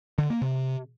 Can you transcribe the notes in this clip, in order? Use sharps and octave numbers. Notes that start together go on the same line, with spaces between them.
D3
A#3
C3